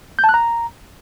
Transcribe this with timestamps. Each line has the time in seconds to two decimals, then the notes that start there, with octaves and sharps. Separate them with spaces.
0.19 G6
0.24 A5
0.29 F#6
0.34 A#5